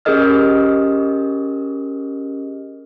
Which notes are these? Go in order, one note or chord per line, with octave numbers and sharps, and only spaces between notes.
C#4 G4 G#4 A#4 D#5 F6